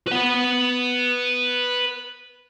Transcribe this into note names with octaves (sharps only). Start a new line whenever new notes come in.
B4 F#5